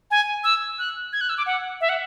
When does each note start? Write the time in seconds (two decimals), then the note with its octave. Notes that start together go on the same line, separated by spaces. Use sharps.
0.11 G#5
0.44 E6
0.79 F#6
1.13 G#6
1.21 F#6
1.29 E6
1.38 D6
1.46 F#5
1.81 E5
1.89 F#5